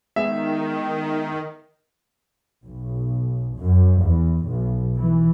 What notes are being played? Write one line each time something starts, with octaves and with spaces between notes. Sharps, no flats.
D#3 G#3 B3 G#4 E5
B1
F#2
E2
B1
E3